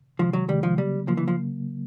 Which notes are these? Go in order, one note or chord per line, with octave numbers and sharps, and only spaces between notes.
C3 D#3 F3 G#3
F#3
C3 D#3 G3 G#3
F3
C#3 F#3 G3 A#3
C#3 F3 F#3 A#3
E3
F3